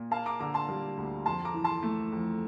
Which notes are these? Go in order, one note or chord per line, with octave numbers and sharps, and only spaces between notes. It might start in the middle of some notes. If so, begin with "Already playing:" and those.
Already playing: A#2
A#3 F5 A5
A#5 D6
D3 A#5 D6
A5 C6
G3
D2
F2 A5 C6
A#5 D6
E3
A5 C6
A3
F2